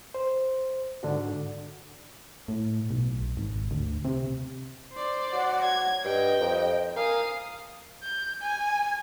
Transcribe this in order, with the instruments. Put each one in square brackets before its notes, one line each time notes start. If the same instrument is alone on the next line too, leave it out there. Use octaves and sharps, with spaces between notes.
[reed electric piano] C5
G#2 D3 D4 F#4
[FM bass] A2
B1
G#1
D2
C3
[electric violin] C5 D5
[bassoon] F#3 [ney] F#5
[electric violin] G#6
[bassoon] G2 [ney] D#5 [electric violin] G5
[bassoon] F2
[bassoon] A#4 [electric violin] F5 D#6 [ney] G#5
[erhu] G6
G#5